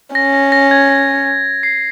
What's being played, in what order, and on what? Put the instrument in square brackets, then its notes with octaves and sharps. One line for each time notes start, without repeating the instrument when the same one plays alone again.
[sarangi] C#4 [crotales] A#6
[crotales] A#6
A#6
G#6
A#6
C7